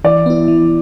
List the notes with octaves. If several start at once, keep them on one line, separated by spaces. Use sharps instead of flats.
E3 D5
B3 E4
E3